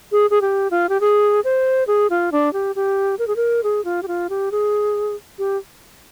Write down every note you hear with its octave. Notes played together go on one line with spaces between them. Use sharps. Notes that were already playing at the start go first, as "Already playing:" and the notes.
G#4
G#4
G4
F4
G4
G#4
C5
G#4
F4
D4
G4
G4
A#4
G#4
A#4
G#4
F4
G4
F4
G4
G#4
G4